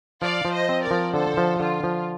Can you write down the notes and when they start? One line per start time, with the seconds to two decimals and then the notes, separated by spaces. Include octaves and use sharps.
0.22 F3 D5 F5
0.45 F3
0.53 C5 D#5
0.69 C4
0.83 A#4 D5
0.91 F3
1.14 D3 A4 C5
1.37 F3
1.60 D3 F4
1.84 F3